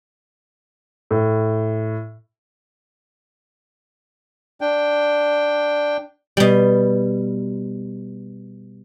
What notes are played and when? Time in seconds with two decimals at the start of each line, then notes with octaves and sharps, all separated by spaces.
1.11 A2
4.61 D4 G5
6.37 B2 G3